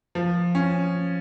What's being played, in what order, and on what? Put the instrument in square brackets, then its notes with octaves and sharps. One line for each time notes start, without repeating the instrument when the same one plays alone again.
[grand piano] F3
C#4